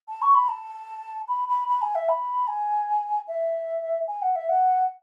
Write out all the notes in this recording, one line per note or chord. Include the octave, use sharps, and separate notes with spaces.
A5
C#6
B5
A5
B5
B5
B5
G#5
E5
B5
G#5
E5
G#5
F#5
E5
F#5